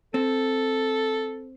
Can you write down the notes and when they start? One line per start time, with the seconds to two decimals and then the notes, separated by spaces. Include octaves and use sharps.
0.14 C4 A4